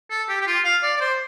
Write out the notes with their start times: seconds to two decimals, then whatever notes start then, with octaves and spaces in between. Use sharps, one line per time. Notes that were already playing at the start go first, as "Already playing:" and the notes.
0.10 A4
0.29 G4
0.41 G4
0.47 F4
0.64 F5
0.83 D5
0.96 D5
1.00 C5